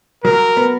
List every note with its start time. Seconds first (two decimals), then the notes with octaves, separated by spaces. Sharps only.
0.24 F#3 A#4
0.57 B3